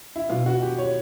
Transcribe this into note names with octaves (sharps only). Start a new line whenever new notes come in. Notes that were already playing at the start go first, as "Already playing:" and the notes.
E4
B2 F4
F#4
G4
C#5